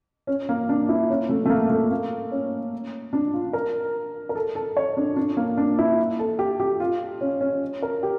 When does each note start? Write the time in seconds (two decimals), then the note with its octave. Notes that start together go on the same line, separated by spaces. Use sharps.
0.27 C#4
0.49 A#3
0.69 D4
0.89 E4
1.10 C#4
1.29 A3
1.45 A3
1.50 A#3
1.70 A3
1.91 A#3
2.32 C#4
3.13 D4
3.33 F4
3.53 A#4
4.29 A#4
4.35 A4
4.55 A4
4.77 C#5
4.97 D4
5.16 D4
5.37 A#3
5.57 D4
5.79 E4
6.19 A4
6.39 G4
6.60 G4
6.80 F4
7.21 C#4
7.41 C#4
7.82 A#4
8.03 G4